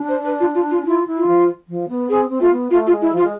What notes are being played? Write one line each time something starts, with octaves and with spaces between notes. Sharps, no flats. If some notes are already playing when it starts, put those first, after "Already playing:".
Already playing: D4
C5
B4
F4
F4
F4
E4 F4
E4
F4
F3
F3
B3
C4 G#4
C4
A3 F4
B3
A3 F4
F4
G#3
E4
F3 F4
G#3